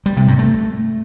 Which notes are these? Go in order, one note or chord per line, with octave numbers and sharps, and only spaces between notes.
G3
C3
G2
A3